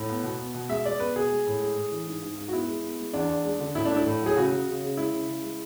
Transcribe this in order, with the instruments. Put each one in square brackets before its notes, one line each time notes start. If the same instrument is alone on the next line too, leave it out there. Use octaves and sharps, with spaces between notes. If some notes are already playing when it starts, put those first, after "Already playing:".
Already playing: [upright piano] A2
B3
B2
B3
B2
G#3 E5
G#3 D5
B3 B4
B2 G#4
G#3
A2
G#3
A2
E3
G#2
G#2
G#2
F#4
B3 E4
G#3
B3
G#3
E2 D4
E2
G#3
D3
A2 E4
A3 D4
E4
A2
F#3 G#4
C#3 F#4
C#3
C#3
C#3
G#3 E4
C#3
C#3
G#3